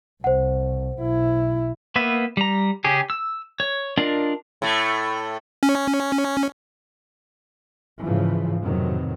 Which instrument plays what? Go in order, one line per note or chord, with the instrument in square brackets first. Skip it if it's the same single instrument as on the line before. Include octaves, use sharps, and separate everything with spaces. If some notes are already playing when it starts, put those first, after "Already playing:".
[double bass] C2 [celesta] C5 F#5
[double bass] B1 E4
[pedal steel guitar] A#3 B3 B4 E5
G3 A#5
C#3 C#4 G4 G#4
E6
C#5
D4 F4 A#4 D5 D#5
[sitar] A2 A3
[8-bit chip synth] C#4
[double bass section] G#2 C#3 E3 F3
F2 A2 C3 D#3 E3 F#3